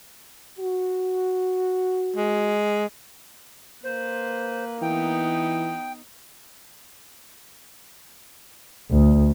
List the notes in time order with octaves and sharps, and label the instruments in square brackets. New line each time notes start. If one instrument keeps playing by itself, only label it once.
[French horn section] F#4
[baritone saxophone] G#3
[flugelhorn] A#3 [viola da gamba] B4 [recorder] C5
[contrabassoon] E3 [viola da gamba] B3 D#4 [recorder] G5
[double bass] D2